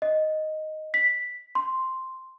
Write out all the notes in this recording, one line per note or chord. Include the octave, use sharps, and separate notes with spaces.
D#5
B6
C6